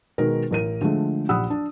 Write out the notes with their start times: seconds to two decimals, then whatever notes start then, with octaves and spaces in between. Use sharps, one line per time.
0.18 B2 D#3 G#3 A#4
0.51 A1 A#4 D#7
0.81 D3 F3 G#3 A3
1.29 A#1 G4 F#5 B5 D#6 E6
1.50 D4